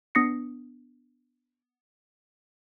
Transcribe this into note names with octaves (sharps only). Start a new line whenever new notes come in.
B3 D4 D#6 A#6 C7 C#7